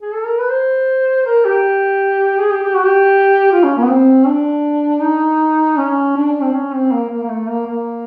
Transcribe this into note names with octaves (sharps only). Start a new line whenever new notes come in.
G#4
A4
A#4
B4
C5
A#4
G4
G#4
G4
G4
F#4
G4
F4
C#4
A#3
B3
C4
D4
D#4
C#4
D4
C4
C#4
C4
A#3
A#3
A#3
A3
A#3
A#3